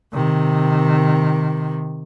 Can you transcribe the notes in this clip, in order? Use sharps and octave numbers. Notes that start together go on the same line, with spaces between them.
C3 D#3